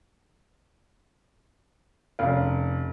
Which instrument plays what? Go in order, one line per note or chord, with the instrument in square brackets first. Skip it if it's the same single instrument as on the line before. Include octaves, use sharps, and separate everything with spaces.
[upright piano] F1 [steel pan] C#4 F5